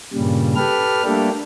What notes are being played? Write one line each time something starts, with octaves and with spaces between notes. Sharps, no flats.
G2 A#2 C#3 G3
G4 A4 B4 F6
G3 A3 A#3 D4 G4 A4